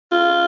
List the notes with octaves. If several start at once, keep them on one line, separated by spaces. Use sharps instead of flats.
F4